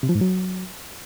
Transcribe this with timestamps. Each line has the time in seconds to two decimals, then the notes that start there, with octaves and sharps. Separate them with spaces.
0.03 C3
0.09 F3
0.15 G#2
0.21 F#3